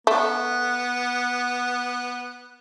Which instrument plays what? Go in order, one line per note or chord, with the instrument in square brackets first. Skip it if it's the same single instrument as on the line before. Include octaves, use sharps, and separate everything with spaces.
[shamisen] A3 [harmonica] B3